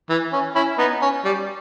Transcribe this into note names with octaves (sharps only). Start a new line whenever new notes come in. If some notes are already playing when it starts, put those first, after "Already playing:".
E3
C#4
C#4 E4
B3 D#4
C#4
G3